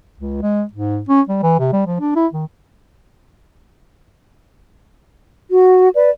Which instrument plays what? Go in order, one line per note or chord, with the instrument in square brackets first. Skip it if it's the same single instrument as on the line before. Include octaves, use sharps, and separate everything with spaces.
[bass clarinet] C#2
G#3
G#2
C#4
G3
E3
C3
G3
F3
D4
E4
D#3
[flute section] F#4
B4 D5